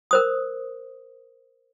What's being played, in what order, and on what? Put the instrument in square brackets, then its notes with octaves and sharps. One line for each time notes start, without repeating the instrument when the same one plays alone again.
[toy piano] A#4 C5 D#6